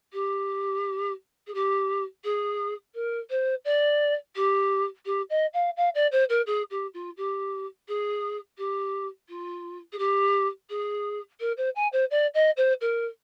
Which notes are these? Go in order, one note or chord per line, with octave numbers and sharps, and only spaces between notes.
G4
G#4
G4
G#4
A#4
C5
D5
G4
G4
D#5
F5
F5
D5
C5
A#4
G#4
G4
F4
G4
G#4
G4
F4
G#4
G4
G#4
A#4
C5
G#5
C5
D5
D#5
C5
A#4